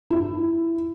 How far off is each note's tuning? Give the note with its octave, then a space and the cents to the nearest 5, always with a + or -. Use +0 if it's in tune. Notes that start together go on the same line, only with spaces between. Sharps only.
E4 +15